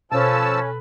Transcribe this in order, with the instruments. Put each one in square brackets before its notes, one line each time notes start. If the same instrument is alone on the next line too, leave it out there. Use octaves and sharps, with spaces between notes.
[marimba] B2 [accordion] F3 A5 E6 [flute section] C#4 [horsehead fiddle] A4 B4